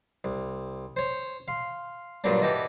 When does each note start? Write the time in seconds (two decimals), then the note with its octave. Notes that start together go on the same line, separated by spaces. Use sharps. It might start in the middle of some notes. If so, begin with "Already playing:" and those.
0.24 C2
0.96 C5 C#5
1.48 F5 C6
2.24 G2 A#2 F#3 G3 A#3 D4
2.42 E3 F#4 G4 A4 D#5